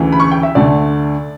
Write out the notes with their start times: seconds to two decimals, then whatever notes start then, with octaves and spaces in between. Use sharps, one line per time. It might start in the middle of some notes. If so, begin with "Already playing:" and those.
Already playing: D2 C#3 E3
0.12 B5
0.20 C#6
0.31 G5
0.43 E5
0.55 D2 D3 A3 D5